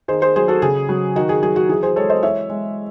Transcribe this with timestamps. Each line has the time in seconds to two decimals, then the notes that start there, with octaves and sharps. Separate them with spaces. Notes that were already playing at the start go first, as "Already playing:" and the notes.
0.08 D#3 G#4 C5
0.22 G#4 C5
0.36 F#3 G#4 C5
0.48 F#4 A4
0.62 C#3 G#4
0.89 F#3
1.16 D#3 F#4
1.29 G#4
1.42 F#3 G#4
1.56 F#4
1.69 E3 G#4
1.83 G#4 C5
1.96 G#3 A4 C#5
2.09 C5 D#5
2.23 E3 C#5 E5
2.49 G#3